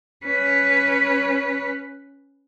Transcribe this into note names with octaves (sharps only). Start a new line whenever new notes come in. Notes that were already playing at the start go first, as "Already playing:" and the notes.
C#4 B4